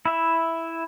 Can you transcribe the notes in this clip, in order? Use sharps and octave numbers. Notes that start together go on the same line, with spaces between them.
E4 E5